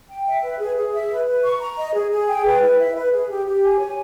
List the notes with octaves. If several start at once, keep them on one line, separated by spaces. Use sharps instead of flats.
G5
E5
B4
G#4
G#4
E5
B4
B4
C#6
A#5
D#5
G#4
G#4
G5
B4
E4
E5
B4
G#4
G4
G4
G#5
C#5